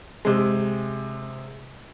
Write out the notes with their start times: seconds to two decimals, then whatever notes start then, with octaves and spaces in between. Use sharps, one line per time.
0.25 C3 G#3